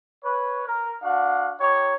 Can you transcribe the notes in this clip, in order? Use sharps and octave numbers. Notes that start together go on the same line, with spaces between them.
B4 C#5
A#4
D4 F#4 F5 F#5
D#4 G4 C#5